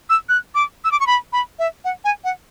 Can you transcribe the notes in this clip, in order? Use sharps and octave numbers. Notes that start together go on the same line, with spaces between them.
E6
F#6
D6
E6
D6
C#6
B5
B5
E5
F#5
G#5
F#5